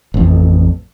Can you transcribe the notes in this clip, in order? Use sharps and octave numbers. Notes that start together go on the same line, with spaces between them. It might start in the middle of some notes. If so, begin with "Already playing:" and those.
A1 F2